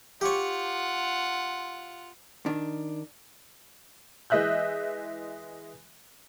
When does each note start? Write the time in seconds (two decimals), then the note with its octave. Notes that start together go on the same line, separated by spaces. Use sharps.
0.21 F4 G4 C#5 F#5
2.46 D#3 D4
4.30 E3 G#3 D#5 E5 F#6 G6